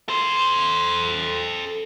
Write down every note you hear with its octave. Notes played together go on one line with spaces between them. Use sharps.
A4 C5